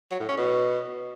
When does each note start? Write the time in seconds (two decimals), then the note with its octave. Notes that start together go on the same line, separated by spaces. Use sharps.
0.11 F#3
0.20 A2
0.29 C#4
0.37 B2